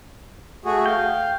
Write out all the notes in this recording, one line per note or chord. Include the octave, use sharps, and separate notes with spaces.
A3 F#4 G#4
F5 G5